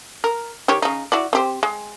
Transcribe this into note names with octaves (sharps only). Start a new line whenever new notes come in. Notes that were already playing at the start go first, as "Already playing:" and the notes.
A#4
D#3 G4 C#5
C#3 D#4
E4 F#4 D5
C4 G4 C5
G#3